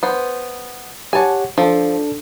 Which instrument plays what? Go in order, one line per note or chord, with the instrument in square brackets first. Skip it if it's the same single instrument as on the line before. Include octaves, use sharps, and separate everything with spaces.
[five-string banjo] B3 C5
[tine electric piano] G4 C#5 F#5 [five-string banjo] G#5 A5
[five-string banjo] F3 [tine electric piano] D4 A4